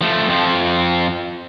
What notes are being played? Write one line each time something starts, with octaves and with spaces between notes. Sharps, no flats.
F3 A3
F2 F3